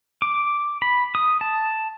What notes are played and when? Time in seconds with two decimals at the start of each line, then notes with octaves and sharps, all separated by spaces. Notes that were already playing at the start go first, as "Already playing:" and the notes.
0.22 D6
0.82 B5
1.15 D#6
1.41 A5